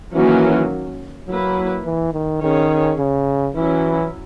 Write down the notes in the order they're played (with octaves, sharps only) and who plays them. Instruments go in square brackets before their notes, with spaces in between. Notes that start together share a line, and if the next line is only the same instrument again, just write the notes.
[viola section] D#3 F#3 A#3 C#4 F#4 [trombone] E3
[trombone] F#3 [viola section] A#3 E4 B4
[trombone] E3
D#3
[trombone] D#3 [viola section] C#4 G#4 C#5
[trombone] C#3
[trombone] E3 [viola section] F#3 C#4 E4